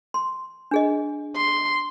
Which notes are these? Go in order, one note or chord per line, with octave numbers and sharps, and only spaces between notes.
C6
D4 G#4 D#5
C6